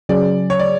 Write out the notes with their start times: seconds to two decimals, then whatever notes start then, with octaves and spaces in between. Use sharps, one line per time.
0.09 C#3 F#3 C#4 G#4 D5
0.50 C#5
0.59 D5